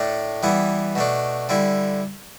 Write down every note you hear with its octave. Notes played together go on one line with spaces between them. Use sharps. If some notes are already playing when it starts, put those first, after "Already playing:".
Already playing: A2 A3 D4
E3 G3 B3 E4
B2 A3 D4
D3 G3 E4